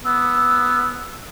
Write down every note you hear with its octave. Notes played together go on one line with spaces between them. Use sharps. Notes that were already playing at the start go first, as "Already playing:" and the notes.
B3 E6